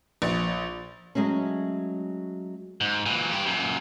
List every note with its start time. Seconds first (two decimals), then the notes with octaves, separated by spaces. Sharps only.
0.22 A#1
1.15 F#3 G#3 A3 C#4
2.81 G#2
3.06 A#2 E3
3.31 G2 G4
3.46 F#2 A#2